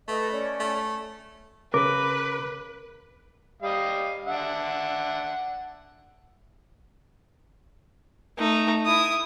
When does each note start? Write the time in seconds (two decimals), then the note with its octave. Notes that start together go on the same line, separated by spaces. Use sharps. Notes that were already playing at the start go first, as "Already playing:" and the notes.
0.08 A3 A4 B4 D#5
0.31 C#4 D5
0.60 A3
1.74 C#3 A#4 B4 D6
3.62 G3 D#5 F5
4.25 D4 E5 F#5
8.38 A3 D#4
8.86 E4 D#6